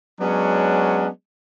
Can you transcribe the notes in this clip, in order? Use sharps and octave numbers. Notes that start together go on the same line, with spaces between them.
F#3 G#3 B3 C#4 D4